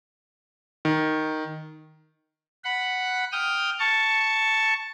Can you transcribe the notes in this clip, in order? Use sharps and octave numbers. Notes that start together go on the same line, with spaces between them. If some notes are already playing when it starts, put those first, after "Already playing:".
D#3
F#5 B5
G5 D#6 F6
A5 C#6